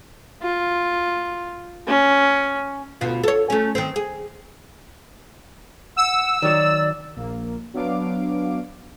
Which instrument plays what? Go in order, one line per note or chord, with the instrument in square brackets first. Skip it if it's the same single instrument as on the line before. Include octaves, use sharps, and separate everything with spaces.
[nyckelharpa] F4
C#4
[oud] D2 B2 F4
A4 C#5
A3 C#4
D#3 C4
G#4
[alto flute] F#5 [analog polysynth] E6
[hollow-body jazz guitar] D#3 F#3 [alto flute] D5
[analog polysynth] A#1 A#3
F#3 B3 D4 F5 D6 D7